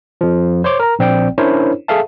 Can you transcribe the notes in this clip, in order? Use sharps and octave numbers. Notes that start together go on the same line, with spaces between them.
F2 F3
C5 C#5 C6 D6
A#4 A#5
A#1 C4 D5 G5
C#4 D4 E4 A#4 C5 C#5
G#4 A4 E5 F5 A5